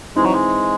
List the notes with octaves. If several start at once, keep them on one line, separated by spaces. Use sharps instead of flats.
E3 G#3 C4 D#4
F#3
G#3